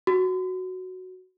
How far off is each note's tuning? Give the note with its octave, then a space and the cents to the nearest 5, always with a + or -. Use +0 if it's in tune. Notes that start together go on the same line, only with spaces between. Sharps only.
F#4 +0